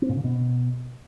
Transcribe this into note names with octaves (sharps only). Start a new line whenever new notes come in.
C4
A#2
C#3
B2